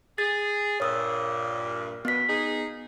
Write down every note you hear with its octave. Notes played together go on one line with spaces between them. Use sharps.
G#4 A6
G2 A#2 C#5 D#6 E6
B2 B3 B6
D#4 G#4